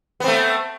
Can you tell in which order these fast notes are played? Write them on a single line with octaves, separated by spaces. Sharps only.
B3 C4 A3